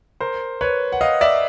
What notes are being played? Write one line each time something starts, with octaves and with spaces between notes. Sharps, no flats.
A#4 C5
B4 C#5
F#5
D#5 F5
D5 E5